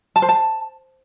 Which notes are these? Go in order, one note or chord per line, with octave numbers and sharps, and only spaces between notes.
A5
C5
A5